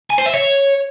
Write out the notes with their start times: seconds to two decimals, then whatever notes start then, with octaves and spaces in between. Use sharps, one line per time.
0.10 G#5
0.18 C5
0.26 E5
0.34 C#5